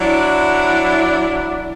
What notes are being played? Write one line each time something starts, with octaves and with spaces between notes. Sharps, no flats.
F#3 D4 E4